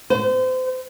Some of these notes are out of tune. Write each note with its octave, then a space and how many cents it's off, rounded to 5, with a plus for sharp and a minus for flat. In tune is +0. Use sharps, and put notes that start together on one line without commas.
C5 -35